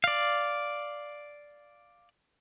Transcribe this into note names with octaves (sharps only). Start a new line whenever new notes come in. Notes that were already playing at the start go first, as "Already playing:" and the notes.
D5 F5